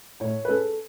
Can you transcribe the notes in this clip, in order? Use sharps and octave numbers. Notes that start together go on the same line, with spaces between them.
A2 C#5
B4
G#3 C#4 A4